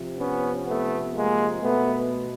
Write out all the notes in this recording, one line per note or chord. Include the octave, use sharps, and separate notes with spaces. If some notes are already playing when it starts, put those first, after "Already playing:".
Already playing: C3 F3
B3 C#4
A3 B3
G#3 A#3
B2 A3 B3